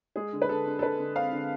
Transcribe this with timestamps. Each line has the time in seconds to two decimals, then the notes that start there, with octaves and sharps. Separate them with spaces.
0.16 G#3 G#4
0.33 D3
0.42 B4
0.49 D3 A4
0.66 D3
0.79 A4
0.82 D3 B4
0.99 D3
1.16 C4 F5
1.32 D3